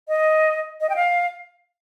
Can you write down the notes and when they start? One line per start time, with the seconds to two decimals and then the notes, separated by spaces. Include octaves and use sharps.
0.08 D#5
0.81 D#5
0.90 G5
0.96 F5